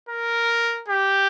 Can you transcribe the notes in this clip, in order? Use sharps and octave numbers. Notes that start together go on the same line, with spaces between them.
A#4
G4